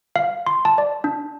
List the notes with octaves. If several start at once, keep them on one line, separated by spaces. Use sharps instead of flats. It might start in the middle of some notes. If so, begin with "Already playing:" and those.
F5
C6
A5
D5
D4